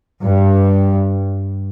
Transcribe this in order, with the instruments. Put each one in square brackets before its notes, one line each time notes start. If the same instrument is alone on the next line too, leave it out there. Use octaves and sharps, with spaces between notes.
[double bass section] G2